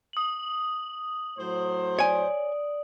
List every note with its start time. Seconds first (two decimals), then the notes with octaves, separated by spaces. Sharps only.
0.13 D#6 F#7
1.38 A2 F#3 C5
1.99 C#5 D5 G#5